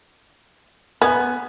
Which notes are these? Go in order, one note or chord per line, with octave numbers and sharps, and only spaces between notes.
B3 G#5 F#6 G#6